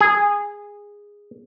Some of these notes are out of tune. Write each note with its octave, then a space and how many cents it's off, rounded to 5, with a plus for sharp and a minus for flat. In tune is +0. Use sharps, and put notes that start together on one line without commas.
G#4 -10